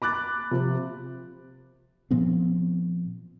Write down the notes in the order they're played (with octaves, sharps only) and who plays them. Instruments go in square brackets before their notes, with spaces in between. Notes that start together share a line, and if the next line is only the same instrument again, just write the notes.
[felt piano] B5 D6 F#6 A6
C3 F3
[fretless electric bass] A#2 F3 B3 C4